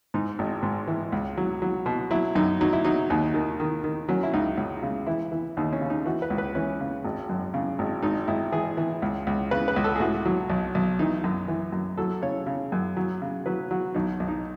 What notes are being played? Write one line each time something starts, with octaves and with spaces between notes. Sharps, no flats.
G#2 D#4
G#1
G#2
E3
C#2
F#3
F#3
B2
F#3 E4
F#2 D#4
F#3 D#4
E4
F#3 D#4
D#2 D#4
D#3
D#3
D#3
F#3 C#4
E4
C#2 D#4
C#2
C#3
E3 E4
E3
D#2 D#4
C#4
C#3
D#4
E3 F#4
B4
C#2
B4
E3 C#4
C#3
G#1
F#2
C#3
G#1
G#1 D#4
G#1 E4
E3 G#4
E3
C#2
C#2
C#3 B4
B4
C#2
A4
G#4
A2 F#4
F#3
B1
B1
E3 D#4
F#2
E3
F#2
F#3 A4
C#3 C#5
C#3
F#2
F#3
C#3
F#3 B4
F#3 F#4
B1 D#4
B1
D#4